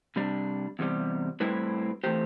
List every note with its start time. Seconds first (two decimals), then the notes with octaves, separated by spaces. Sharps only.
0.16 C3 G3 D4
0.79 E2 C3 G3
1.40 A2 G3 C4 E4 B4
2.04 E3 A3 C4 G4 C5